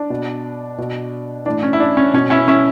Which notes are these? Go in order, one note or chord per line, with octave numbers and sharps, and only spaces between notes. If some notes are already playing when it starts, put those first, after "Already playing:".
Already playing: D4
B2
B2
A2 E3 D4
C#4
E4
D4
C#4
B2 C#4
C#4 E4
C#4 E4